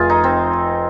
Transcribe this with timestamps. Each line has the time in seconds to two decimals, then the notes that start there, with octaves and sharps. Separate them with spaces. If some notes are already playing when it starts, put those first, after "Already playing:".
Already playing: F1 F4 G#4
0.10 D#4
0.24 C4